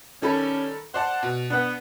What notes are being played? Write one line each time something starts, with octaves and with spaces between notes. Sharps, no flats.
D#3 G3 C#4 A4 B5
C5 D5 F#5 A5
B2
B3 D4 F#5